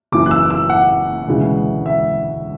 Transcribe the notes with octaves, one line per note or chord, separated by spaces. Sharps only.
F#1 F#2 E3 D6
F#6
E6
E6
F#5
E1 D2 C#3 E3 G#3
E5